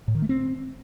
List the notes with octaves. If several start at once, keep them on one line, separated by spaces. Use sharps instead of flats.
A2
D#3
A3
C4